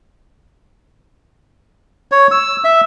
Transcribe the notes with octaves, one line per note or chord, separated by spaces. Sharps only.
C#5
E6
E5